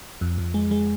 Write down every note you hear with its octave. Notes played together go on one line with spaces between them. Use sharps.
F2
F2
G#3
G#3